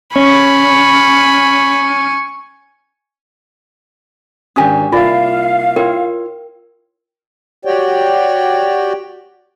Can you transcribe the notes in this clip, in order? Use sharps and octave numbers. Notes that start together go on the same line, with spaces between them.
C#4 G#5 B5 C#6
G#1 C#4 D4 G4 G#5 D#6
C2 A#3 F4 D5 E5 F5
E4 F4 A#4 C#5 G5
F#4 G4 C#5 D5 G5